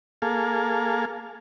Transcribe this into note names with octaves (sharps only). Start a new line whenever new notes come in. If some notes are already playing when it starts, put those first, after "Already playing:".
A#3 G#4 A4 F5